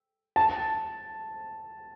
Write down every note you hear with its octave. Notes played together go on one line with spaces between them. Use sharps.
A5